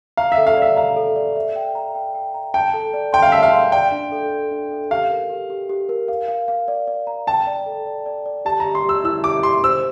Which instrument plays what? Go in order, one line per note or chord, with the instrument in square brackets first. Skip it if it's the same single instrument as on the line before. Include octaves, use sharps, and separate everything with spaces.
[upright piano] F5 [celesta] A#5
[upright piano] E5
[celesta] A4
[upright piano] F5
[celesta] D5 [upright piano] E5
[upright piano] F5 [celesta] A#5
[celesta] A4
D5
E5
G5
A#5
G5
G5
A#5
[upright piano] G5 [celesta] A5
[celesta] A4
D5
[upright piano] G5 [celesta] C6
[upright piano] F5
[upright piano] E5 [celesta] A5
[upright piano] F5
[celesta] C6
[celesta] D5 [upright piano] G5
[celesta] D4
A4
A4
D4
A4
[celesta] G4 [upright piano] F5
[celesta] A#4
G4
G4
G4
A#4
F5
F5
F5
D5
D5
A#5
[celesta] G5 [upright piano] A5
[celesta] D5
A4
D5
D5
D5
[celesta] G4 [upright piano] A5
[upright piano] A#5
[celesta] G4
[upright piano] C6
[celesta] G4 [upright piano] E6
[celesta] E4 [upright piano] E6
[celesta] G4 [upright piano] D6
[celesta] G4 [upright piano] C6
[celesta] C5 [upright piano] E6